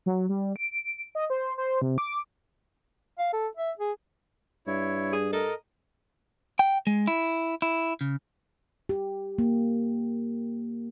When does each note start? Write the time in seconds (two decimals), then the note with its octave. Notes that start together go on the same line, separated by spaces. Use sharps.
0.06 F#3
0.29 G3
0.56 D7
1.15 D#5
1.30 C5
1.58 C5
1.82 C3
1.98 D6
3.19 F5
3.33 A4
3.57 E5
3.79 G#4
4.67 G2 E4 C#5
5.13 G#4
5.33 A4 A#4 D#5
6.59 G5
6.87 G#3
7.08 E4
7.62 E4
8.01 C#3
8.89 G4
9.38 A#3